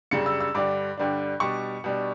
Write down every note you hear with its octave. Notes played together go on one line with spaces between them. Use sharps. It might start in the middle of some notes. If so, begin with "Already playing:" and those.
F#2 C#3 G3 D4 C#7
E6
E6
G2 D3 G3 D4 D6
G2 D3 G3 D4
B2 G3 D4 C#6
B2 G3 D4